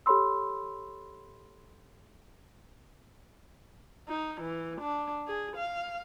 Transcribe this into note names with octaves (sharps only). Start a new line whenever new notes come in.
G4 A4 C#5 B5 C6 E6
D#4
E3
D4
G#4
F5